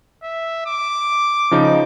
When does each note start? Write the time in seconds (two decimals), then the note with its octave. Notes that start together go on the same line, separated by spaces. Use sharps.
0.23 E5
0.66 D6
1.51 C#3 F3 D#4